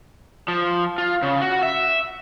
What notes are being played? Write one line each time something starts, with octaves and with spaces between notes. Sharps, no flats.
F3
F4
C#3
F#4
E5